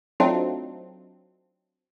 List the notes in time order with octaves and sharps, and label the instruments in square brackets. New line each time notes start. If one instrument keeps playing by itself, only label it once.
[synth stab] F#3 A3 C4 D4 D#4 F4